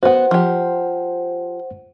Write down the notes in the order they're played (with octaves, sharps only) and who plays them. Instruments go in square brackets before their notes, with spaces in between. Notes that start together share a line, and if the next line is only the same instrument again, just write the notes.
[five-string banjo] B3 F#4 [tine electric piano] C5 F#5
[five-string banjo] F3 G4